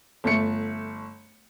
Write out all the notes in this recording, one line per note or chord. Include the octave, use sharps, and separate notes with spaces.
G1 A3 C#7